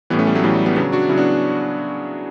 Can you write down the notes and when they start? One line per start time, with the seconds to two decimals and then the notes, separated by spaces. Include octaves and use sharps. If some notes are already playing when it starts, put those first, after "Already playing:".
0.10 A2 E3 G3 B3
0.19 A3 C#4
0.27 G3 B3
0.35 F#3 A3
0.44 A2 E3 G3
0.55 G3
0.66 G3 B3
0.76 C#3 F#3 B3 D4
0.92 D4 F#4
1.09 C#3 F#3 C#4 E4
1.18 B3 D4